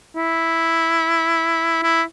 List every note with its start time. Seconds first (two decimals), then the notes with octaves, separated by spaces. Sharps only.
0.16 E4
1.83 E4